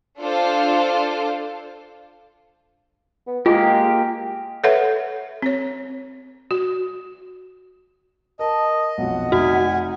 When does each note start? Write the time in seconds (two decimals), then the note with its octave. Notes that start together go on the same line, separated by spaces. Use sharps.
0.20 D4 F4 A4 C5 F5
3.27 B3
3.46 G#3 A#3 F4 G4
4.64 A4 B4 C#5 E5 F#5
5.42 C4 C#5
6.51 F#4
8.39 A#4 D#5 A5
8.98 B1 F2 F#5
9.32 F1 D#4 F#4 G#5